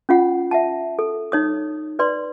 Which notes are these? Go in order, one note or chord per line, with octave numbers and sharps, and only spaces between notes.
C#4 F4 F#5
E5 F#5 A5
A4
D#4 C#5 D#6
B4 D5 C6